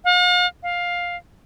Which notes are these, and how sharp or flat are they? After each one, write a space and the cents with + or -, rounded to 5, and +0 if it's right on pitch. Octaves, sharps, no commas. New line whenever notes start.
F5 +45
F5 +10